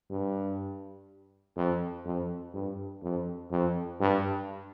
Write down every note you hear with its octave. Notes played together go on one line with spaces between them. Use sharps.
G2
F2
F2
G2
F2
F2
G2